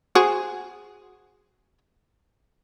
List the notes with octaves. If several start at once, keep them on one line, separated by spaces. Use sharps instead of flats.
F#4 G#4 C5